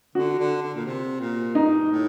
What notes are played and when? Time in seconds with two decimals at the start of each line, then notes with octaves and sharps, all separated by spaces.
0.15 D3 F#4
0.39 D3
0.63 D3
0.74 A#2
0.86 C3
1.20 A#2
1.55 G2 D#4
1.91 A2